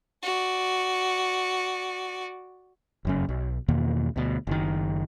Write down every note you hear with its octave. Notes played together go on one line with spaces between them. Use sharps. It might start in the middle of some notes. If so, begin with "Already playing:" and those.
F#4 D5
F1 F#2 C#3
B1
E2 B2 D#3 A#3
D2 B2
F#1 D#3